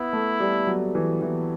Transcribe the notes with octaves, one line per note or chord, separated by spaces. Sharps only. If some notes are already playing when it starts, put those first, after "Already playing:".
Already playing: B3 E4
A3
G3
F#3
E3
E3